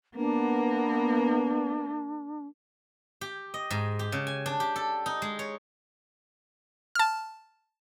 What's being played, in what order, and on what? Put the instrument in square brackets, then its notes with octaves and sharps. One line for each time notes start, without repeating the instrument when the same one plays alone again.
[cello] A#3 [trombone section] B3 [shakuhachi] D4
[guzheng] G4
D#5
G#2
G4
C#3
G#5
D4
G4
A4
D#4
G#3
C#5
[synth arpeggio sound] A5 F6